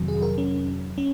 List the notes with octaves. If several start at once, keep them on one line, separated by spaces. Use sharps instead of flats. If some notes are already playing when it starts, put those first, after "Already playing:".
Already playing: F2 C3 D#3 F#3
G#4
A#4
C#4
C#4